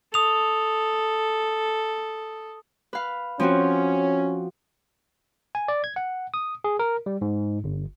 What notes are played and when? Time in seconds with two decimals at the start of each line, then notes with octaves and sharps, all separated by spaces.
0.14 A4 D#6 F7
2.93 B4 F5
3.40 F3 C4 C#4 F#4
5.55 G#5
5.68 D5
5.84 G#6
5.96 F#5
6.34 D#6
6.64 G#4
6.79 A#4
7.06 G3
7.21 G#2
7.64 G1